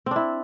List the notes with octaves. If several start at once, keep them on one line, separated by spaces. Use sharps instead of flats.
C4 D4 E4